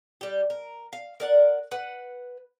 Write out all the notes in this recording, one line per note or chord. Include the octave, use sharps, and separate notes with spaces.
G3 G4
A#4
F5
A#4 D5 F#5
B4 F#5